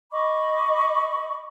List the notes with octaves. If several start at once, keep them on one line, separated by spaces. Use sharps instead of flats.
D#5 B5 C#6 D6